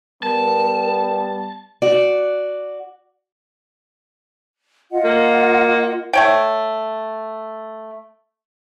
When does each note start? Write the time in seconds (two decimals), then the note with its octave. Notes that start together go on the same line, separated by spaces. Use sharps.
0.23 G3 B3 A#4 A5
1.82 F#4 D5
4.92 F4 D#5 F#5
5.04 A#3
6.13 A3 C#5 G5